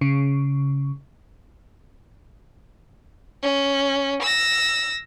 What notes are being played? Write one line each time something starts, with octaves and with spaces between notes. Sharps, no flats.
C#3
C#4
E6 A#6